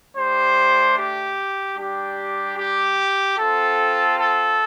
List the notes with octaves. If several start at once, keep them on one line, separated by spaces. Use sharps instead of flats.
A3 D4 G4 C5
G4
G3 D4 G4
G4
C4 F4 A4
A4